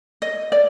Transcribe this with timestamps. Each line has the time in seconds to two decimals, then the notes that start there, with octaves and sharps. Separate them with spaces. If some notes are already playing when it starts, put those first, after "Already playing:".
0.22 D#5
0.52 D5